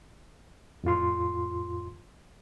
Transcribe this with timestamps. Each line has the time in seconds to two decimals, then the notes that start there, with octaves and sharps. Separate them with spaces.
0.84 F2 A2 F4 C6